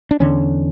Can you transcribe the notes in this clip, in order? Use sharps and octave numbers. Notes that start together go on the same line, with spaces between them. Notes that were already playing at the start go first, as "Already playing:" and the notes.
D4
E2 D3 C#4